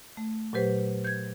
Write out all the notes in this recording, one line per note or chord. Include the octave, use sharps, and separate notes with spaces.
A3
A#2 F#3 G4 B4 C5
G6 G#6